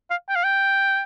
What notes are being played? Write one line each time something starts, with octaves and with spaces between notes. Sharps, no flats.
F5
G5
F5
G5